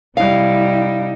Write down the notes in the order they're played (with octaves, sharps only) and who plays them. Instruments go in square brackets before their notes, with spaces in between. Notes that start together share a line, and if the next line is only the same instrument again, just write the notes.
[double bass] C3 G3 [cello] D#4 E4 [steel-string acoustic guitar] F5